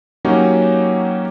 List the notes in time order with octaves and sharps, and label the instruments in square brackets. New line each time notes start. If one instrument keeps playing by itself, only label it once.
[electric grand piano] F#3 A#3 C#4 D#4 F#4 G4